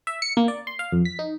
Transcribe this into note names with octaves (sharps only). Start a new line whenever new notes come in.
E5
C#7
A#3
D5
C6
F5
F2
B6
D#4